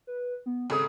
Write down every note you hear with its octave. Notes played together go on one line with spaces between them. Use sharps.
B4
B3
G#1 C#3 A4 D#6